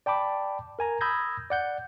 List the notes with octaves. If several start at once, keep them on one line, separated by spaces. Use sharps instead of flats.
D5 G5 A5 B5 D6
A#4 G#5 A#5
B5 D#6 E6 G6 G#6 A#6
D5 F#5 G6